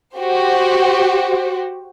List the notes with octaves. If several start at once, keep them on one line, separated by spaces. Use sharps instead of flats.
F#4 G4 C5